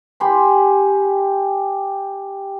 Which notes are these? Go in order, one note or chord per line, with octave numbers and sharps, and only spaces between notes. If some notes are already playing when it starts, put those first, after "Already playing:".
G4 G#5 B5 C6